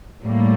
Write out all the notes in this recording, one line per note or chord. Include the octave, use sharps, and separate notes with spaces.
A2 G3 A#3